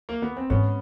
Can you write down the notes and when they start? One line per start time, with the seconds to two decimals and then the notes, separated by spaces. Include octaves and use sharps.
0.09 A#3
0.22 B3
0.37 C4
0.50 G#2 B3 C#4